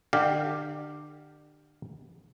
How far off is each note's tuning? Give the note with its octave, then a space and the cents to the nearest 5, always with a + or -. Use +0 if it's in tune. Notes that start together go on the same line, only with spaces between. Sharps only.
D3 +35 G4 +0 F5 +0